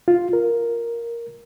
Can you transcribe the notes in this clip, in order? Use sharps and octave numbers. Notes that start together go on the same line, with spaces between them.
F4
A#4